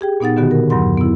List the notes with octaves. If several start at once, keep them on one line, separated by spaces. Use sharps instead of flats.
G4 G#4 G5
A#2 B3 D#4 F#5 A6
B2 D3 D#3 B3 F#4 G4
A#4
E2 G2 F#3 F#5 C6
B3 E4